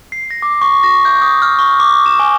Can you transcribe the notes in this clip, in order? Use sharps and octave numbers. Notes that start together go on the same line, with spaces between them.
C7
A#6
D6
C#6
A#6
G6
D#6
F6
C#6
D6
E7
G#5